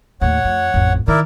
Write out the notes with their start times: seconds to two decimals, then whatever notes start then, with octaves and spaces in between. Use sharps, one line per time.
0.21 D#2 A2 C#5 F#5
0.45 F2
0.74 A1 F2
1.08 D#3 E4 A#4 D5